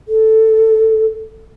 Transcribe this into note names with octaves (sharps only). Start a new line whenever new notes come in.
A4